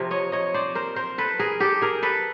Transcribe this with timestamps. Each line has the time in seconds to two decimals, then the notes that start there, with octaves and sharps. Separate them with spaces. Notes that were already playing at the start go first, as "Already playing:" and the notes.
Already playing: C3 F3 A#3
0.11 C#5 D#5
0.32 C#5 D#5
0.54 C5 D5
0.75 A#4 C5
0.96 A#4 C5
1.18 A4 B4
1.39 G#4 A#4
1.60 G4 A4
1.81 G#4 A#4
2.03 A4 B4